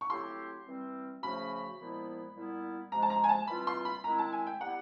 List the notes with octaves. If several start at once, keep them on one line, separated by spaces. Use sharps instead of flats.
C#6
F#3 A3 C4 E4 G4 C6
E3 G3 C4
C#3 F3 A3 C#4 F#4 B5
A#2 F3 G#3 B3 E4
A#2 G3 B3 E4
C3 F3 G#3 A#5
A5
A#5
G#5
A5
E3 G3 C4 F4 B5
C6
B5
D#3 G#3 C4 E4 A#5
A5
G#5
G5
G3 B3 E4 G4 F#5